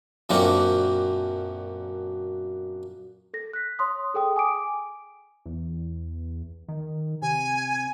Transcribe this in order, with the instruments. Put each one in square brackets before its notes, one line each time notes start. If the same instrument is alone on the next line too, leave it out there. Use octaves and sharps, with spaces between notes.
[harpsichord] F#2 A#2 D3 F#3 A#3 C4
[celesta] A4 A#6
F#6 B6
C#5 C6 D#6
G#4 A4 G5 D#6
G#5 D6 D7
[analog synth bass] E2
D#3
[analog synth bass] C3 [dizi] G#5